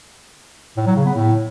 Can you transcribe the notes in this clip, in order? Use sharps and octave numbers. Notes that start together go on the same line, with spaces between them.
A2
F#3
C#3
B3
A2